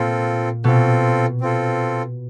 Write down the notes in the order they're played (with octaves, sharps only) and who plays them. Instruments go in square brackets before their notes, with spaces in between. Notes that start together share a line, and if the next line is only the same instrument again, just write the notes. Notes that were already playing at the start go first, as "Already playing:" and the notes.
Already playing: [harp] A#2 A#3 [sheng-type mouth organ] C4 F4 A4
[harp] B2 B3 [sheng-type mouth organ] C4 F4 A4
[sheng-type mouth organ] C4 F4 A4